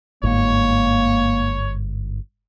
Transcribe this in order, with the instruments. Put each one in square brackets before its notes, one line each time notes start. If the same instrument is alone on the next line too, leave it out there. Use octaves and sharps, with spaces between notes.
[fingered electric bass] G1 G#2 [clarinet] A#3 [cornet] C#5